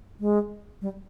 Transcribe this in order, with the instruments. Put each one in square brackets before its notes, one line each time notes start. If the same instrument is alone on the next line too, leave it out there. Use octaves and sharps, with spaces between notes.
[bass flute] G#3
G3